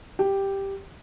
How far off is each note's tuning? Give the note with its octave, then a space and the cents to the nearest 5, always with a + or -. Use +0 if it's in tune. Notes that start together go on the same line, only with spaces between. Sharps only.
G4 +0 G5 +0